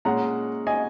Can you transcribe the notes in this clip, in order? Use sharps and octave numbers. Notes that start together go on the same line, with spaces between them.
A#2 G#3 C#4 F#5 A#5
D#5 G#5